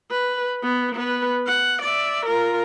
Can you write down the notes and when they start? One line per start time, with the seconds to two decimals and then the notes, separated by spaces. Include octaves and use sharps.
0.11 B4
0.63 B3
0.95 B3 B4
1.47 F#5
1.82 D5 E5
2.26 F4 A#4